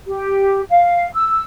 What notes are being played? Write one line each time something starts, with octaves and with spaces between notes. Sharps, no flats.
G4
F5
E6